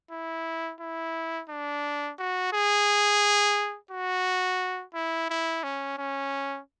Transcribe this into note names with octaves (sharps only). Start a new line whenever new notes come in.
E4
E4
D4
F#4
G#4
F#4
E4
E4
C#4
C#4